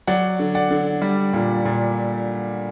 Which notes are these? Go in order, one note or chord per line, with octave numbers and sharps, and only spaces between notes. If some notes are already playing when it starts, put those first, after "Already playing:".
F#3 D5 F#5
D3
D5 F#5
D3
G3
A#2
A#2